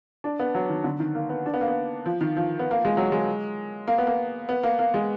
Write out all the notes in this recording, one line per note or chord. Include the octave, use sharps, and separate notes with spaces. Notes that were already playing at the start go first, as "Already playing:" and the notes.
D4
B3
F#3
D#3
D3
D#3
A#3
B3
D4
B3
A#3
B3
F3
D#3
F3
B3
A#3
G#3
F#3
G#3
A#3
B3
A#3
B3
A#3
A#3
G#3